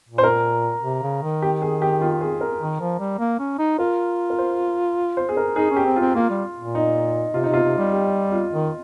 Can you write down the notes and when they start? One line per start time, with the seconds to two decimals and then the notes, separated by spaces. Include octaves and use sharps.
0.09 A#2
0.18 C5
0.23 A#4
0.83 C3
1.03 C#3
1.23 D#3
1.42 G4
1.62 G#4
1.82 G4
2.01 F4
2.21 G#4
2.41 A#4
2.61 D#3
2.81 F3
3.00 G3
3.19 A#3
3.40 C#4
3.59 D#4
3.79 F4 A#4
4.30 A#4
4.38 C5
5.17 C5
5.29 G#4
5.37 A#4
5.56 D#4 G#4
5.71 C#4
5.76 G4
5.86 C4
5.96 F4
6.01 C4
6.15 A#3 F4
6.30 G3
6.60 A#2
6.75 D#4
7.34 C3 F4
7.44 D#4
7.49 C3 F4
7.63 C3
7.78 G3
7.93 G4
8.32 F4
8.52 D#3